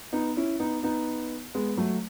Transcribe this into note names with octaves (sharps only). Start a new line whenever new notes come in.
B3 D#4
C#4 E4
B3 D#4
B3 D#4
G#3 B3
F#3 A3